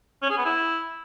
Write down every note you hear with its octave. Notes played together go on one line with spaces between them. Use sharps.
C#4
G#4
B3
E4